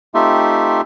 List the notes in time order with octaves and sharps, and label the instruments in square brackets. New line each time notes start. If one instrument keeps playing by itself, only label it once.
[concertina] A3 C4 D#4 F4 G4 E5